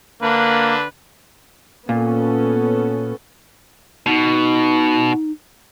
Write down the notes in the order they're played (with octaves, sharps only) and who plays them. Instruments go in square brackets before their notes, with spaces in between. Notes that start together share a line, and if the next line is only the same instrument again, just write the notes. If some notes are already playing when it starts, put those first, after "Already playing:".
[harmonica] D3 D4 B4 [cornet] A#3
[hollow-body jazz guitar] A#2 [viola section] B3 C#4 A4
[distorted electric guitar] B2 [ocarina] D#4